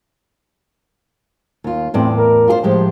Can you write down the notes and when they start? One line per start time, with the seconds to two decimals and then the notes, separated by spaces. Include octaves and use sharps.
1.64 D#2 F4
1.94 E2 A2 C4 D5
2.16 A#4
2.48 F4 G#4 C5
2.63 A2 F3 G#3 G4